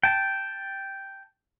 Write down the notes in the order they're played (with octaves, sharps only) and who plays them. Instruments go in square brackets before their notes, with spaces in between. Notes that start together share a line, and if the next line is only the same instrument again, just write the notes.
[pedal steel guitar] G5 A5